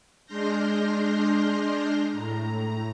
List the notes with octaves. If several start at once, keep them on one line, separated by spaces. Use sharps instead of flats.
G#3 D4 C6 F6 G6 A#6
A2 A#5